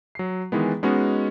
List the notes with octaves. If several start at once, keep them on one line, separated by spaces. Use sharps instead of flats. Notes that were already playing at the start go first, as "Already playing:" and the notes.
F#3 C7
D#3 E3 G#3 B3
G#3 B3 C#4 D#4 F#4